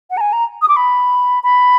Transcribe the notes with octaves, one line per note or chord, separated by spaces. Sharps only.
F#5
A#5
G#5
A#5
D#6
D6
B5
B5